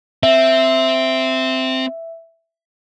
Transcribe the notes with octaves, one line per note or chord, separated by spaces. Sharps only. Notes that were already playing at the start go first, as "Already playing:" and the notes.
C4 E5